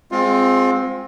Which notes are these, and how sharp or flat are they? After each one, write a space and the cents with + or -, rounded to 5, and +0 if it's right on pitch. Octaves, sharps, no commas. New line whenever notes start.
G#3 +0 C4 +0 F4 +30